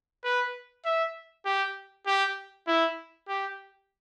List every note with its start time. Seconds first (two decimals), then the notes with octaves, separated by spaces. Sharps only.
0.24 B4
0.85 E5
1.46 G4
2.07 G4
2.68 E4
3.28 G4